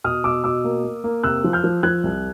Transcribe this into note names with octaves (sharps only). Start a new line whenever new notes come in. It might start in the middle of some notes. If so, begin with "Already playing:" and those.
B2 D#6 F6
B2 D6 E6
B2 D6 E6
A#3
A#3
A#3
C3 E6 F#6
F3
F6 G6
F3
F3 F#6 G#6
C2